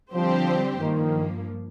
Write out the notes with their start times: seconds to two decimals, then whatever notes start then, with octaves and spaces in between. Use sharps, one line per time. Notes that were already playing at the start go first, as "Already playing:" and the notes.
0.13 D3 F3 G3 C4 G4 C5
0.80 G2 D#3 F3 A#3